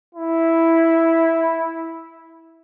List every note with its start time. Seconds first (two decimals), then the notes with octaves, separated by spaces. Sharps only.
0.15 E4